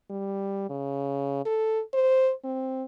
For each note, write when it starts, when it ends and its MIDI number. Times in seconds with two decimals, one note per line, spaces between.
0.10 0.69 55
0.70 1.44 49
1.46 1.81 69
1.94 2.32 72
2.44 2.84 60